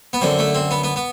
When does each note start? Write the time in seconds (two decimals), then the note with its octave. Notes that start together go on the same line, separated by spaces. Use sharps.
0.13 B3
0.21 F#2 D3 C4
0.39 A3
0.55 C4
0.71 B3
0.84 B3
0.96 B3